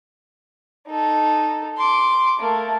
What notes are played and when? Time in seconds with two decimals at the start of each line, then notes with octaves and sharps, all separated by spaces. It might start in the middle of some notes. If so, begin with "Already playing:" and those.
0.88 D#4 A4
1.78 C6 D6
2.39 A3 A#3